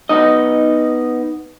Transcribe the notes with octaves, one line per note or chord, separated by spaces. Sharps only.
B3 D#4 D#5